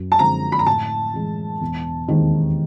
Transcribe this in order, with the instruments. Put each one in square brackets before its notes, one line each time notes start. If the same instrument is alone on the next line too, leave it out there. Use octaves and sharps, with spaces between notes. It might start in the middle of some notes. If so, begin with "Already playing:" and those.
Already playing: [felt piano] F#2
[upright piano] A5
[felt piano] D3 F3 G#3 C4 [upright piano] A#5
[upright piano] B5
A#5
[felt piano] A2 [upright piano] A5
[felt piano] E3 G#3
E1
D#2 D#3 G#3 C4